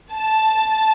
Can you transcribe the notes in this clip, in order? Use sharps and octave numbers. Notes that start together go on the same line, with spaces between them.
A5